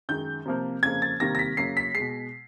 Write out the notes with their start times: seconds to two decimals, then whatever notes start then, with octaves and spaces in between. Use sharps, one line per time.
0.09 F#2 D#3 G#3 G6
0.45 C3 F3 A#3
0.83 F2 C#3 F3 A#3 G#6
1.02 A6
1.20 C3 D#3 G3 A#3 A#6
1.35 A#6
1.39 B6
1.57 F#2 C#3 F#3 A#3 C7
1.77 B6
1.95 G#3 C7
2.00 B2